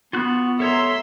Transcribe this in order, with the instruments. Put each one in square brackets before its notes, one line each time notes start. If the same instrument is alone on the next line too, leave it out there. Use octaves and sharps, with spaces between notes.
[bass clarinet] B3 [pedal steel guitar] F4 F#4 F#6
[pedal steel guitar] A4 C#5 A#5 [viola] E5 C6